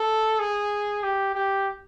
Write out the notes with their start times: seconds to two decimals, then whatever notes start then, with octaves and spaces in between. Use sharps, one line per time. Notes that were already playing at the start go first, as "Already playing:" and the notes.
Already playing: A4
0.39 G#4
1.03 G4
1.35 G4